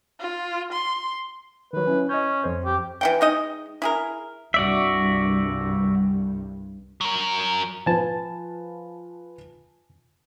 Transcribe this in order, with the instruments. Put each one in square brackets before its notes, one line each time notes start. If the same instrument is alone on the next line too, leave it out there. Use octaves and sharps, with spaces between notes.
[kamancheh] F4
C6
[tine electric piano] D#3 F#3 [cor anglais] B4
[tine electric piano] C#4 E4
[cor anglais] C#4 [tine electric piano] D#5 G6
[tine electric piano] F2 C5
[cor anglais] G4
[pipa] E3 F#5 G5
G#3 D#4 D#5
E4 G#4 A#4
[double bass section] C2 G2 G3 [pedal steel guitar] F#4 D5 E5
[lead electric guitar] F#3 A#4
[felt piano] F3 F4 B4 [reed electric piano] G#5 A5